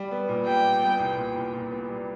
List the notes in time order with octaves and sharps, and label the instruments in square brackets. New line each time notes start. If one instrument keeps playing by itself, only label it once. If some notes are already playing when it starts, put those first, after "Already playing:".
Already playing: [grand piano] G3
B3
A#2
[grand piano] G3 [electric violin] G5
[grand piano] G3
B3
C2
A#2
C2
A#2
B3
G3